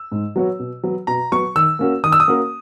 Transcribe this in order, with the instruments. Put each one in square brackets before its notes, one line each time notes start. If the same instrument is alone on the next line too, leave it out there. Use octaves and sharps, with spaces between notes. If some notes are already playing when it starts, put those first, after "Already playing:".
Already playing: [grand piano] E6
[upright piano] G#2
F#3 B3 F#4 C#5
B2
F#3 B3
[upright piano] B2 [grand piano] A#5
[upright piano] F#3 B3 [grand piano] C#6
[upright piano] D#3 [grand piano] E6
[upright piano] A#3 C#4 F#4 A#4
[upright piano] D#3 [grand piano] D#6
[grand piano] E6
D#6
[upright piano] A#3 C#4 F#4 A#4